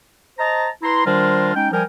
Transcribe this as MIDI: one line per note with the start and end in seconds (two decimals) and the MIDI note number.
0.38 0.67 72
0.38 0.67 75
0.38 0.67 81
0.38 0.67 82
0.82 1.02 64
0.82 1.02 71
0.82 1.02 82
0.82 1.02 84
1.05 1.54 51
1.05 1.54 55
1.05 1.54 62
1.05 1.54 65
1.05 1.54 70
1.05 1.54 72
1.55 1.67 56
1.55 1.67 61
1.55 1.67 63
1.55 1.67 79
1.72 1.82 53
1.72 1.82 55
1.72 1.82 70
1.72 1.82 79
1.72 1.82 80